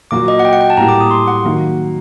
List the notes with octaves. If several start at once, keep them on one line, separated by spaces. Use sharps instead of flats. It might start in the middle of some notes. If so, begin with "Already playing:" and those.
A#2 F#3 A#3 F#4 D6
D#5
F#5
G5
F#5
G5
A5
A2 G3 A#3 A#5
D6
D#6
C6
F#5
D#3 F#3 A#3